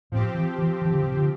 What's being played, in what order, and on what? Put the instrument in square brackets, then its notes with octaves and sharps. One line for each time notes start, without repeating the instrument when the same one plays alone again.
[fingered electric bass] A2 [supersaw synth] F3 C4 G4
[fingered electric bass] E3
E3
E3
D3
C3
D3